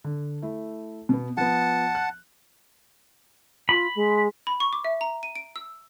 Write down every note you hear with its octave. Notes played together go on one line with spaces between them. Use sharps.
D3
A3 E4
B2 B3
F3 B3 F#5 A5
F#6
F4 B5
G#3
B5
C#6
D6
E5
A#5
D#7
D7
E6